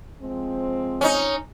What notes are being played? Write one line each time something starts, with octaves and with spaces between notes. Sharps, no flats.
F3 G#3 C4
C#4 D#4